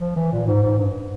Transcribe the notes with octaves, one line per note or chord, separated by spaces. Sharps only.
F3
E3
A#2
G#2
G#2
G2